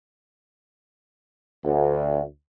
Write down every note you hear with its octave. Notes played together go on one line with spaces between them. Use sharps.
D2